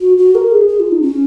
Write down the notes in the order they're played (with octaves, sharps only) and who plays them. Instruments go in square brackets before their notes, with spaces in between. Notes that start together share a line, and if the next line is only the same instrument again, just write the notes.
[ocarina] F#4
F#4
A#4
G#4
G#4
F4
D#4
C#4